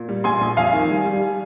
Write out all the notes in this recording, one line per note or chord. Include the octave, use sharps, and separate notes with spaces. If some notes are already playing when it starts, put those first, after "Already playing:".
Already playing: A#2
G3
A#1 G#5 C6
A#1
F2 F5 G#5
D#3
G3
G3